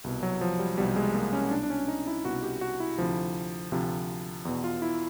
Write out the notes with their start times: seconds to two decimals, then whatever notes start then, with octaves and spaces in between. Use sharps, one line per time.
0.04 C2 B2
0.23 F#3
0.41 F3
0.59 G3
0.78 C2 B2 G3
0.96 G#3
1.14 A#3
1.33 C#4
1.51 C2 B2 D4
1.63 D4
1.70 C#4
1.88 D#4
2.07 E4
2.25 C2 B2 F#4
2.43 G4
2.61 F#4
2.80 E4
2.98 D2 C3 F3
3.72 D2 C3 F3
4.45 E2 B2
4.64 F4
4.82 E4